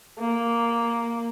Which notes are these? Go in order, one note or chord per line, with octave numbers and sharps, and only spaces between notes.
A#3